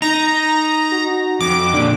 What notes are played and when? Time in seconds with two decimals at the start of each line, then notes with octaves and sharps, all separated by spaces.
0.02 D#4 A#5
0.92 F#4
1.41 F2 D6
1.74 A#2 D3 D4